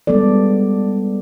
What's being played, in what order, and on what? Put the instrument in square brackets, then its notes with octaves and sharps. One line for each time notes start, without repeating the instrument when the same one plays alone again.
[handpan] G3 G#3 B3 A4 D5